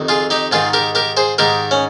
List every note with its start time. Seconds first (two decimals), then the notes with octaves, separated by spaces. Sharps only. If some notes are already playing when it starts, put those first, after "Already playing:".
Already playing: F2 C3 D#3
0.08 F4 G#4
0.30 D#4 G4
0.51 G#2 D#3 F4 G#4
0.73 G4 A#4
0.95 G4 A#4
1.17 G#4 C5
1.38 G#2 D#3 G4 A#4
1.71 C#4